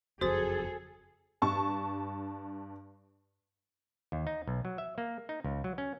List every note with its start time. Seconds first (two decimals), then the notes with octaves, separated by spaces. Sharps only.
0.21 F#1 F2 F#4 G#4 A4 C5 D#6 A6
1.42 G2 A5 C#6
4.12 D#2
4.27 D#4
4.47 B1
4.65 F#3
4.78 E5
4.98 A#3
5.29 D#4
5.44 C#2
5.64 F#3
5.78 C#4